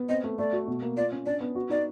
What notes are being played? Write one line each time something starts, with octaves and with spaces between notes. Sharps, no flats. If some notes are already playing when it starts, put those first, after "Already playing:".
Already playing: B3
C4 D#5
A3
A3 D5
F#4
B2
A#3
F4 D5
C#4
D4 D5
B3
F#4
D#4 D5